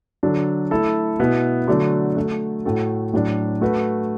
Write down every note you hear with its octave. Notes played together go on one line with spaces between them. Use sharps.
D3 F#3 D4 A4
A3 E4 A4
B2 B3 E4
D3 F#3 A3 D4 F#4
A3 F#4 A4
A2 A3 F#4 A4
A2 F#3 D4
A3 F#4 B4